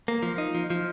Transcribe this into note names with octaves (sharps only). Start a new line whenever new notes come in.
A#3
F3
D#4
F3
F3